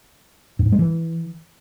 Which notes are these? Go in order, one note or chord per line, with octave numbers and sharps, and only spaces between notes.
G2
G#2
G#3
E3